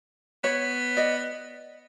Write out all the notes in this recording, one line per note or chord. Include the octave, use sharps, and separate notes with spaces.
B3 C#5
D5 D#5